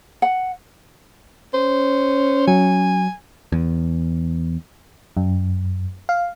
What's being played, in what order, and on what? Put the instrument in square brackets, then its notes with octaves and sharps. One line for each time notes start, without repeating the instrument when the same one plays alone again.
[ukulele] F#5
[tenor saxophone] C#4 [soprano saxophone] C5
[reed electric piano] F#3 [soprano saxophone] G#5
[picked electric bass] E2
[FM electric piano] F#2
F5